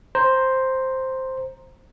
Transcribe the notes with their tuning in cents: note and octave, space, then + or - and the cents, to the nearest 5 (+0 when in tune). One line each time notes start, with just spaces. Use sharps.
C5 +0 A#5 +0